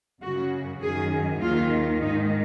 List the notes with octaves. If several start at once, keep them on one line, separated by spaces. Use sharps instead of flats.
F#2 C#3 F#4
F#2 D#3 G#4
D#2 D#3 F4
G#2 D#3 D#4